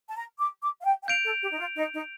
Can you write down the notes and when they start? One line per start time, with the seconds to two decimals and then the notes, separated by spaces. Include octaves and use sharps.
0.09 A5
0.16 A#5
0.40 D6
0.62 D6
0.80 F5
0.85 G5
1.03 G5
1.08 F5 G6 D7 F7
1.25 A4
1.42 G4
1.51 D#4
1.59 F4
1.77 D#4
1.94 D#4